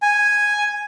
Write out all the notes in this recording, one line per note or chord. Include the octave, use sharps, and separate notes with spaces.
G#5